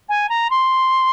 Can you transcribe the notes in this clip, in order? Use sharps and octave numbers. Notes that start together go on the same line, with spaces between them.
G#5
A#5
C6